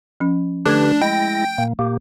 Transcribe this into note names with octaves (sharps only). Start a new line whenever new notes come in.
F3 C#4
D3 A3 D4 G4 B4 G#6
G#3 E4 G5 A#6
A#2 A#3
A#2 A#3 G4